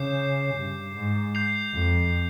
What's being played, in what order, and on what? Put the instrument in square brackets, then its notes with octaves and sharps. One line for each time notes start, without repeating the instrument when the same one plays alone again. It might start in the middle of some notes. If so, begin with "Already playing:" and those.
Already playing: [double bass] C#3 [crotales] D6 G6 C7 E7
[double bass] G2
G#2
[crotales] G6 C7 F7
[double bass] F2